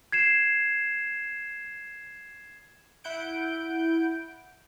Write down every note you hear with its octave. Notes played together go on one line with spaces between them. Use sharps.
G#6 C7 E7
E4 F#5 G6 D7